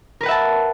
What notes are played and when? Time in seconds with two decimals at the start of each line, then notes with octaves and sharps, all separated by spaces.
0.21 A#4
0.23 B4
0.26 F#5
0.28 E5
0.31 A5